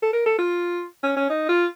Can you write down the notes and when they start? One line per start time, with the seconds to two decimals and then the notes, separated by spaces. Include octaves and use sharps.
0.02 A4
0.13 A#4
0.26 A4
0.39 F4
1.03 C#4
1.16 C#4
1.30 D#4
1.49 F4